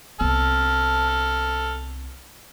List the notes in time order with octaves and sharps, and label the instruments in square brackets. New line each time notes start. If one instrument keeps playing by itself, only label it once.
[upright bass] C2 B3 [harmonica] A4 F6